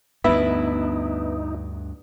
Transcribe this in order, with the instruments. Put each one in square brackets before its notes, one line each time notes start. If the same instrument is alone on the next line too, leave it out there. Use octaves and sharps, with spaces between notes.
[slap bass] D2 G2 [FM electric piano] B3 B4 [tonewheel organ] D#4 [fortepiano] E4